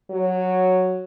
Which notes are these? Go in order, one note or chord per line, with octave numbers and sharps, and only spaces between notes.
F#3